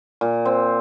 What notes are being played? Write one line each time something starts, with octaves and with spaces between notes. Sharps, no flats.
A#2
C4